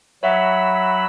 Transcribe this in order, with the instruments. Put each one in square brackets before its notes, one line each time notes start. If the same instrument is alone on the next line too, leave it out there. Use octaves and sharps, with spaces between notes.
[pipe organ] F#3 B5 E6 [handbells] C#5 E5 F#5